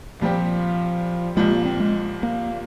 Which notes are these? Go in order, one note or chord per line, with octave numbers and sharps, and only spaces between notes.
A#2 F3 G3 C4 G4
C2 A#2 F3 G#3
A#3
C4
G#3
A#3